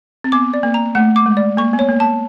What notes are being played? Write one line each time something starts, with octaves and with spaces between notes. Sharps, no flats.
C4
B3 D6
D5
A#3
A#5
A3 F#5
D6
G#3
D5
A#3 C#6
B3
C#5
A#3
A5